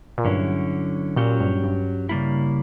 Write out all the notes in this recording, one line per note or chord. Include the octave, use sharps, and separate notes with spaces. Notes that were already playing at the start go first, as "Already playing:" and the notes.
A#2
G2 D3 F#3 C#4 E4
A#2 F#3 C#4 G4
G2
G2
C#3 G3 A#3 E4